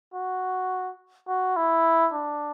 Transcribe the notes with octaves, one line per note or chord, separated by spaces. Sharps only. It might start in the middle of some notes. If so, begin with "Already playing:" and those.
F#4
F#4
E4
D4